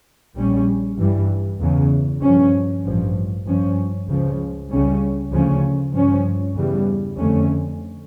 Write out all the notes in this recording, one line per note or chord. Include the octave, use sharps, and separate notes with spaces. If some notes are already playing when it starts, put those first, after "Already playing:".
A#1 A#2 G3 C#4
G2 E3 G3
E2 C#3 E3
G2 F3 C#4
A1 G2 F3
G2 F3 C#4
C#2 C#3 F3
C#2 C#3 G3 C#4
D2 C#3 F3 C#4
G2 F3 C#4
E2 C#3 E3 G3
F2 D3 A3 C#4